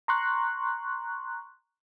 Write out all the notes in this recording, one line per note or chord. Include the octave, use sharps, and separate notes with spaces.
A#5 C6 C#6 F#6